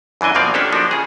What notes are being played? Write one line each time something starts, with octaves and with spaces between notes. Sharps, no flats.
F#2 E3 D4 D#5 G#5
B2 F3 A#3 C4 D5 F5
C#4 D4 G4 A4
F3 A#3 D4 D#4 F#4
C#3 G#4